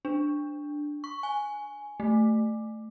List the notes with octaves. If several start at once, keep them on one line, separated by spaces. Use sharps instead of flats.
D4
C#6
G#5
A3